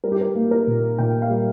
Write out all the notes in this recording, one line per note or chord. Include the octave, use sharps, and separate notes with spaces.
G3 A#4
G4
A#4
A#3
A#4
A#2
A#2 G5
F5
G3